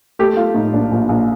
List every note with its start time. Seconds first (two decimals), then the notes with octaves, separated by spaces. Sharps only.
0.19 A3 G4
0.37 A3 F4
0.55 A2 D#4
0.73 A#1 D4
0.92 A#1
1.09 A#1